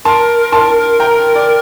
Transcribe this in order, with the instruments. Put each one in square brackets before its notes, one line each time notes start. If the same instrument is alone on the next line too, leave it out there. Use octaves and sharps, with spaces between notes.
[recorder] A#4 [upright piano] A5 C6
[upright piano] A5 C6
G5 A#5
D5